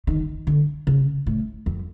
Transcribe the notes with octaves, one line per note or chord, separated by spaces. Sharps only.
D#3
D3
C#3
A2
F2